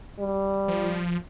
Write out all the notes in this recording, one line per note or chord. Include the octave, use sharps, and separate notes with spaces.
G3
F3